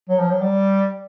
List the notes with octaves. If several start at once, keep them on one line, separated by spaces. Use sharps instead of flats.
F#3
F3
F#3
G3